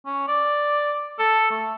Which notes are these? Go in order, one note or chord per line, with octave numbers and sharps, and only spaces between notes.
C#4
D5
A4
A3